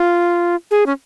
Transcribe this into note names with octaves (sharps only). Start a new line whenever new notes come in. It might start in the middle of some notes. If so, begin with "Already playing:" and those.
Already playing: F4
G#4
C#4